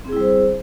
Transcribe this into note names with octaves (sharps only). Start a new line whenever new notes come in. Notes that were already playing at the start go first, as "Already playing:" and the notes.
G3 C4 E4 G#4 C5